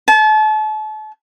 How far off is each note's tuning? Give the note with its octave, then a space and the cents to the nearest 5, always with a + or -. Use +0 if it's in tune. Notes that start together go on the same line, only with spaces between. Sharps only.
A5 -35